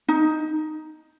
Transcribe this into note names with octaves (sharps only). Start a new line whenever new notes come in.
D#4